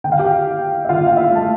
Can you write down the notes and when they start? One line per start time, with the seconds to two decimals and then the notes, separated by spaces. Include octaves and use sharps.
0.04 D3 G5
0.12 F5
0.19 G4 G5
0.46 E4
0.85 E5
0.89 D3 F4 F5
1.07 F5
1.17 E4 E5
1.31 A3 A5